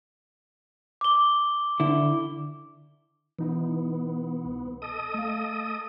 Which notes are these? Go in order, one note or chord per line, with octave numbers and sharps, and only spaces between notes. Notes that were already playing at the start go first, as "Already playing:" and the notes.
D6 G7
D3 E4
B2 E3 B3 D#4 E4
C2
A4 D#5 D#6
A3 F5